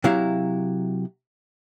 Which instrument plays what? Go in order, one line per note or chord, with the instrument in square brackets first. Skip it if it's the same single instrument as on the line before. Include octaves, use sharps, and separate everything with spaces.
[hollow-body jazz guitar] C3 F#3 E4 F5